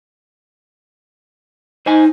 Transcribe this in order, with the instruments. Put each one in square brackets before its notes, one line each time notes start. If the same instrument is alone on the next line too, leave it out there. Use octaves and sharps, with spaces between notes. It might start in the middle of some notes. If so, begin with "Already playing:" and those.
[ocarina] D#4 [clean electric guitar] C5 D#5 G#5